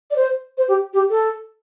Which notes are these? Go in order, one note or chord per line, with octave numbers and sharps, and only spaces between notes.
D5
C5
C5
G4
G4
A4